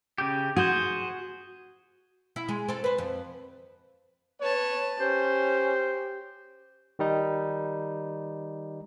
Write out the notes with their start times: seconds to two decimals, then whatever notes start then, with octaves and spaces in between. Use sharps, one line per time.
0.18 C#3 G4
0.56 F#4 G#4 C5
2.36 E4
2.49 G#3
2.68 C4 A4
2.84 B4 C5
2.98 F2
4.40 B4 C#5 A5
5.00 C#4 G4 C5
6.99 D#3 G3 D#4